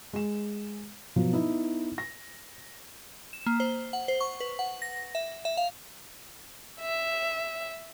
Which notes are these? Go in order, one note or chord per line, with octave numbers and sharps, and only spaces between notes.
G#3 E7
B2 F3 F#3
B3 D#4 E4
A#6
E7
A#3
C5
F#5
C5
C#6
B4
F#5
A#6
E5
E5
F5
E5